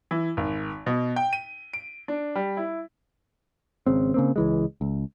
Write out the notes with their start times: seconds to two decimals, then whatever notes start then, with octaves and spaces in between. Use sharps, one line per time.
0.11 E3
0.37 G#1
0.86 B2
1.16 G5
1.33 D#7
1.73 D7
2.08 D4
2.35 G3
2.57 E4
3.87 G#1 C#3 C4
4.14 C#3 A#3 C4
4.36 C#2 E3 G#3
4.81 C#2